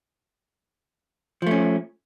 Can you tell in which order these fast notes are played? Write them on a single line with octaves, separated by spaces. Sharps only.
F3 A3 C#4